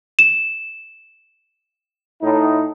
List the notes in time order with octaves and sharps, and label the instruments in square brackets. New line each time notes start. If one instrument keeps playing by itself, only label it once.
[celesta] E7
[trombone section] A2 D#4